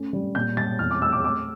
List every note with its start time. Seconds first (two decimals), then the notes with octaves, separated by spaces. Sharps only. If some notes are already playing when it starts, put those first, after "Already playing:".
Already playing: A3 C#4
0.13 G3
0.35 A#2 G6
0.57 G3 A6
0.79 E2 F6
0.91 D6
1.01 A3 E6
1.12 D6
1.23 A3 D6